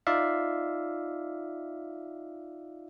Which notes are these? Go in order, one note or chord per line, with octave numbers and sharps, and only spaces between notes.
D#4 F4 D5 E5 F5